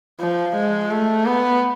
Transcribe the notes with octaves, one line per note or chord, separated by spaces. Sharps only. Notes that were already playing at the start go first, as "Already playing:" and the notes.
F3
G#3
A3
B3